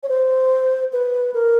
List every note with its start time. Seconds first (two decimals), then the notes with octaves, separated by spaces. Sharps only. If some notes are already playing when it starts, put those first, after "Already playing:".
0.03 C#5
0.09 C5
0.93 B4
1.34 A#4